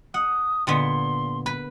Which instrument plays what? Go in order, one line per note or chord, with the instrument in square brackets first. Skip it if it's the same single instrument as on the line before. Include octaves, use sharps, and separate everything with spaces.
[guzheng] F#5 [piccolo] D#6
[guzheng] A#2 D3 B3 [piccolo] C6
[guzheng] B4